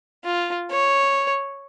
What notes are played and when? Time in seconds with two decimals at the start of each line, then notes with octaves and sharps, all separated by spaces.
0.24 F4
0.71 C#5